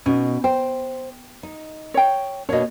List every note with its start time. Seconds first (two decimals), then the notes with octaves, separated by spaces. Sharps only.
0.06 B2 C#4 D#4
0.44 C5 G5
1.43 D#4
1.94 C#5 G5
2.49 B2 A#3 D4 C#5 D#5